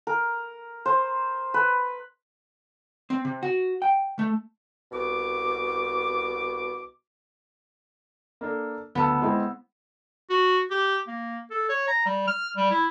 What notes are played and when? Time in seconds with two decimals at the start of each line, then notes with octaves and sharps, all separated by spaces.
0.07 A#4
0.86 C5
1.54 B4
3.10 C4
3.25 C3
3.43 F#4
3.82 G5
4.19 A3
4.92 C2 B2 D6
8.41 A#3 D4 A4
8.95 D2 B3 A5 E6
9.22 G#3 C4 E4
10.30 F#4
10.71 G4
11.07 A#3
11.50 A4
11.69 C#5
11.88 A#5
12.06 G3
12.27 F6
12.57 G3
12.71 E4